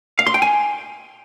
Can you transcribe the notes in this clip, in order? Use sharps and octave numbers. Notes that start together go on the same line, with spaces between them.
F5
C6
G5
G#5